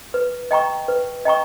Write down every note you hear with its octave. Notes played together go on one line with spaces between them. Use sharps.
B4
D#5 G5 A#5 C#6
B4
D#5 G5 A#5 C#6